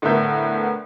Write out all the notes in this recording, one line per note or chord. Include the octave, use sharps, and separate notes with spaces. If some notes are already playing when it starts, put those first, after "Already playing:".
A2 D3 B3 A#4 E5 G6